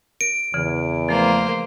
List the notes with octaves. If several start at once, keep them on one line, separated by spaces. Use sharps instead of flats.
A#4 D7
E2 C#3 E3
F3 A3 A#3 C5